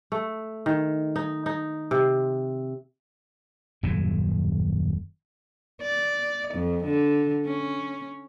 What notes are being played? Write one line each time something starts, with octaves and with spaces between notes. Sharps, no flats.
A3
D#3
D#4
D#4
C3
D#1 F#2 A2 C#3
D5
F2
D3
C#4